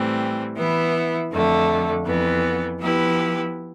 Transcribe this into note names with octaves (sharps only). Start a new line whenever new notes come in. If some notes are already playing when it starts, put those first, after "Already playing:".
Already playing: A2 E3 G3 C4
E3 B3 E4
F2 D3 A3
F2 E3 B3
F3 B3 E4 G4 B4